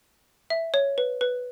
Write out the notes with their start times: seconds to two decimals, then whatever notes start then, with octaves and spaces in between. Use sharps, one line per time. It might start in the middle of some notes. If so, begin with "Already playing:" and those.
0.50 E5
0.74 C#5
0.98 B4
1.21 B4